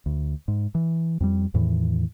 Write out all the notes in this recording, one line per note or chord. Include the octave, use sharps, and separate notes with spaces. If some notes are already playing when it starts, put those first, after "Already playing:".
D2
G#2
E3
F2 F#3 G3
E2 A2 D#3 E3